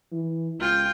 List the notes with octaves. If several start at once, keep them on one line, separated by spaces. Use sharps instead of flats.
E3
C#2 F4 G5